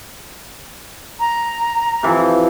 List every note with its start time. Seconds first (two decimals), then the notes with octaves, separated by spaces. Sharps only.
1.20 A#5
2.03 C3 E3 F3